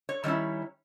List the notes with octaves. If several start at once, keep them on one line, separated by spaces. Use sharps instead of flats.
C#5
D#3 G3 C#4 E4